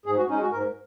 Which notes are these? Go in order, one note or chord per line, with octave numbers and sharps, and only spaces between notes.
G#2 G#4
F#4
G#3 C#4 D#4
F#4
G#2 A#4